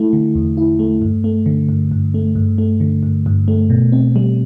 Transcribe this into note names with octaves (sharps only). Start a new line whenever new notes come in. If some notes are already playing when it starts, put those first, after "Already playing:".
Already playing: A3 E4
D3
E2
E4
A3
G2
A3
D3
G2
G2
A3
G2
A3
D3
G2
G2
A3
B2
C4
G3